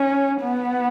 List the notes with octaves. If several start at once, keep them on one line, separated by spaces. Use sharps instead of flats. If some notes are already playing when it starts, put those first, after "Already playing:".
Already playing: C#4
B3